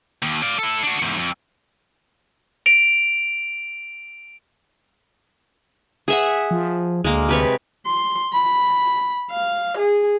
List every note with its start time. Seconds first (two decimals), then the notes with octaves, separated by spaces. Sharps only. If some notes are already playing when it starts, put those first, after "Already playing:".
0.22 D#2
0.42 D5 F5
0.59 E4 A4
0.83 D4 F#4
1.02 E2 G#2
1.17 F2
2.66 D7 F7
6.08 G#4 E5 F#5
6.51 F3
7.04 D2 G#3 A#3
7.29 C3 B4 C#5
7.86 C6
8.33 B5
9.31 F5
9.78 G#4